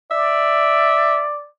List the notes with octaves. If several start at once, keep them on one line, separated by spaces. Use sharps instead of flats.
D5 E5